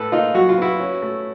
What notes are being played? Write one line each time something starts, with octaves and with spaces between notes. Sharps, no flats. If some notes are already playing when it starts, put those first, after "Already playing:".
Already playing: A2 A4 B4
A#3 D#4 F4
F#2 F#4
F4
B3 E4 F#4
C#4
A3